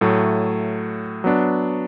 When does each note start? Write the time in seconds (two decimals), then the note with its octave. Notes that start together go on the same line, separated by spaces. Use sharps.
0.01 A2 F#3 A3
1.24 F#3 B3 D4